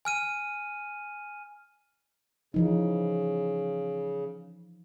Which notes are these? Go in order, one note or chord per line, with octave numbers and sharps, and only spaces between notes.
G#5 F6 D#7
C#3 E3 F3 D#4